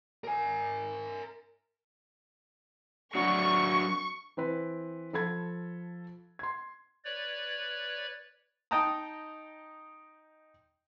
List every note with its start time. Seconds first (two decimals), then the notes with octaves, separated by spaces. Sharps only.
0.24 A#4 G#5
3.15 F#3 D4 F#4 C#6
4.37 E3 C4 B4
5.13 F3 A4 B5 G#6
6.39 C6 G#6
7.05 B4 C#5 D5
8.71 D#4 D#5 G5 A5 A#5 D#6